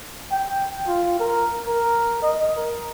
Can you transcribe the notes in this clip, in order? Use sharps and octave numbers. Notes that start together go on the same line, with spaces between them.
G5
F4
A#4
A#4
D#5
A#4